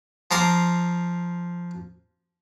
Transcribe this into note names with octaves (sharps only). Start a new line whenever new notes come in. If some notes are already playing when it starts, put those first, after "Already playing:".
F3 A#5 C6 D6